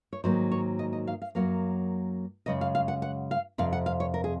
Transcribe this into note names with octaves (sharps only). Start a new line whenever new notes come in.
C#5
G#2 D#3 F#3 A#3 C5
C#5
D#5
D#5
F5
F5
F#2 C#3 F#3 A#3 F5
F#2 C#3 G#3 D#5
F5
F5
F#5
F#5
F5
F2 C3 F5
F#5
F5
C#5
A#4
G#4